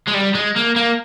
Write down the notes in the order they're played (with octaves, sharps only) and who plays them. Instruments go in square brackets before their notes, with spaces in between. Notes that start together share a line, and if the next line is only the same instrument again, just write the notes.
[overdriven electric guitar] G#3
G3
G#3
A#3
A#3